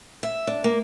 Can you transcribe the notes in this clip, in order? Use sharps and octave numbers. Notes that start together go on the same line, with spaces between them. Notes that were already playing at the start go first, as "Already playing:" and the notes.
E5
D4
A#3